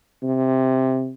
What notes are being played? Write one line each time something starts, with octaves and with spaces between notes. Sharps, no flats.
C3